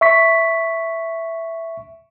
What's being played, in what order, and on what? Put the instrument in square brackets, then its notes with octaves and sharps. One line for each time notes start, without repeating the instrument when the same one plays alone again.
[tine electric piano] E5 C#6 B6